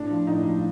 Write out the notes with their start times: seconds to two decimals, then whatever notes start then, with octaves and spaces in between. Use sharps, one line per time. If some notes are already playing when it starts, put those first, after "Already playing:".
Already playing: A2 D4
0.10 F3
0.27 A2 D#4
0.46 F3